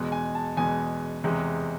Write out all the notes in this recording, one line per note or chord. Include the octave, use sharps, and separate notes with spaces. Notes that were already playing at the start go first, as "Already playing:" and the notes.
Already playing: E2 B2 G#3
G#5
A5
E2 B2 G#3 G#5
E2 C3 G#3